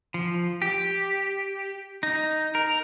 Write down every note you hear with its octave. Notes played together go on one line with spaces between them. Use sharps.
F3
G4
D#4
A#4